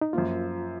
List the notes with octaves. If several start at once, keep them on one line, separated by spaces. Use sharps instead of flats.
D#4
F#2 F3 A#3 F4